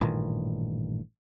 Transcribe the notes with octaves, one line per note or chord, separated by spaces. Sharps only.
A1 G2 A#2 D#3